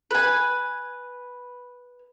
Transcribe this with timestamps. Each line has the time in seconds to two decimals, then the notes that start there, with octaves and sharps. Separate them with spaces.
0.11 B4 G#5